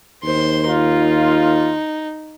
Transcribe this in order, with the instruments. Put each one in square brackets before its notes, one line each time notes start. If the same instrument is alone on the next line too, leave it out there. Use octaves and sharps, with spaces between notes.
[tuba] D#2 [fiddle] C5 C6
[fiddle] D#4 [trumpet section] F4